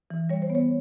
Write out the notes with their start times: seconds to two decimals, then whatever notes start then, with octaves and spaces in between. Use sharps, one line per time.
0.10 E3
0.29 G3 C#5
0.42 C5
0.50 B3
0.55 C#5